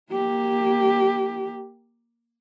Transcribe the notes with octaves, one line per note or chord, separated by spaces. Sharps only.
A#3 G4